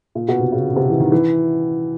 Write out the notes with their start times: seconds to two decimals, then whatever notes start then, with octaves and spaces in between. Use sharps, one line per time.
0.15 A#2
0.28 B2
0.40 C3
0.52 C#3
0.64 D3
0.76 C3
0.90 E3
1.00 D#3
1.12 E3